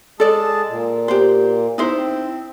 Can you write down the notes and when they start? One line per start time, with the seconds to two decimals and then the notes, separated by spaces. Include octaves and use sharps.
0.20 G#3 G#4 A4 D5 A5
0.69 A#2
1.08 G4 C5
1.78 D#4 E4 C5
1.97 C4